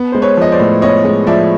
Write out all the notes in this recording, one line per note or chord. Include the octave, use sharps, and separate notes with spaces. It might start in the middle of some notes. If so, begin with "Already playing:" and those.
Already playing: B3
G#3 C5
B4 C#5
F3 D#5
C5 D5
A2
B3 C#5 D#5
G#3
F3 D5 E5